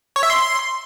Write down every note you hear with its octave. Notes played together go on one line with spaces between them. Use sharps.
C#5
E5
C6